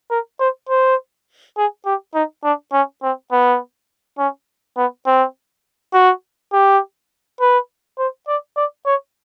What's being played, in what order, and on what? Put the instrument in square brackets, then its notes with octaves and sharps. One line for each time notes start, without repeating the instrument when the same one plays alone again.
[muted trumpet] A#4
C5
C5
G#4
G4
D#4
D4
C#4
C4
B3
C#4
B3
C4
F#4
G4
B4
C5
D5
D5
C#5